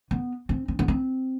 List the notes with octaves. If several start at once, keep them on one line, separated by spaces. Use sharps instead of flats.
B3
C4
C4
B3
C4